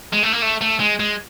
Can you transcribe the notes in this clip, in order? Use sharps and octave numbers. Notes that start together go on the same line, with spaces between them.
G#3
A3
A#3
A3
A3
G#3
G#3